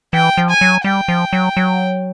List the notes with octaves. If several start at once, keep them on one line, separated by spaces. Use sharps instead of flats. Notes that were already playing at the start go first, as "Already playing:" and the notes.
E3 G5
F3
G#5
F#3
G3 G5
F3
F#3
F#3